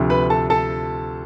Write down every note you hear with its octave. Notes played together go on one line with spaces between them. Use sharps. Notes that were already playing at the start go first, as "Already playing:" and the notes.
Already playing: D2 C3 F3
B4 B5
A4 A5
A4 A5